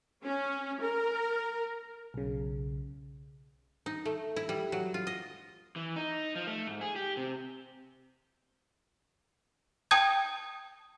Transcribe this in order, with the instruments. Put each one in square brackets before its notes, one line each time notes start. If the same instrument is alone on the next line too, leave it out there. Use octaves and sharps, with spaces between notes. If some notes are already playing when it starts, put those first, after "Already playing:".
[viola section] C#4
A#4
[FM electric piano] B1 C#3
[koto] D#4
A3
E4
G3
F#3
F4
D#5
[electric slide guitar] E3
D#4
F3
A3
G#2
G#4
G4
C3
[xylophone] G5 A5 D#6 G6 G#6